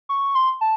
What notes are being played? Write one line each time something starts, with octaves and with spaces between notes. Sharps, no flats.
C#6
C6
A5